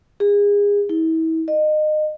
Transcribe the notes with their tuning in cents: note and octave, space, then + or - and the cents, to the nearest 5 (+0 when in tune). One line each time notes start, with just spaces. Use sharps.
G#4 -30
E4 -35
D#5 -25